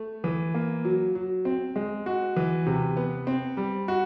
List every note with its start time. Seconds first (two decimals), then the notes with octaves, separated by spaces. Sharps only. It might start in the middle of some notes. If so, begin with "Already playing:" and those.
Already playing: A3
0.24 E3
0.54 A#3
0.85 F#3
1.15 F#3
1.45 C4
1.76 G#3
2.06 F#4
2.36 E3
2.66 C3
2.97 B3
3.27 C4
3.57 G3
3.88 F#4